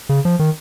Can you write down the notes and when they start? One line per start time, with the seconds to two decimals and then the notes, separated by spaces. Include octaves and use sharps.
0.09 C#3
0.25 F3
0.39 D#3